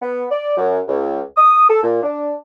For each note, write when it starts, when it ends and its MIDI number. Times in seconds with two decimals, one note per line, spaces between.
0.01 0.25 59
0.30 0.55 74
0.56 0.79 42
0.88 1.21 37
1.36 1.66 87
1.69 1.83 69
1.83 2.02 46
2.02 2.32 62